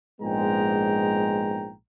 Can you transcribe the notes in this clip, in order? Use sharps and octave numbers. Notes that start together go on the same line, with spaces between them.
A#1 G#2 G#3 B3 G5 A#5